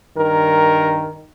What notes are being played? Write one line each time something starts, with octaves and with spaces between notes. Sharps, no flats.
G2 D#3 A#4